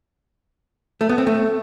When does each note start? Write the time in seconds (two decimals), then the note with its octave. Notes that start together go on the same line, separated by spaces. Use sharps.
1.01 A3
1.09 B3
1.18 C4
1.27 A3